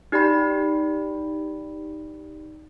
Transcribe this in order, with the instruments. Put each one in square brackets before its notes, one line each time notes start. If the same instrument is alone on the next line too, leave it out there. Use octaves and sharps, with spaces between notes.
[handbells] D#4 G4 D5 G5 B5